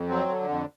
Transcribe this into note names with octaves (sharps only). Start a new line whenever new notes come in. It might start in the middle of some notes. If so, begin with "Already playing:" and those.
Already playing: F2
F#3 C4
D3
F2